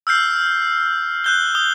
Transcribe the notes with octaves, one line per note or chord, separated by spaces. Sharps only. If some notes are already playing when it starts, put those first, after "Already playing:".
E6 F6 G6 C7
F#6 G6 G7
D#6 G7